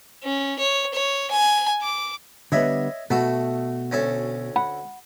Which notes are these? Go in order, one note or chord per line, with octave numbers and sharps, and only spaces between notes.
C#4
C#5
C#5
G#5
D6
D3 G3 B3 C#5 D#5 E5
B2 A3 F#4 A4
D2 C#4 A4
F#5 B5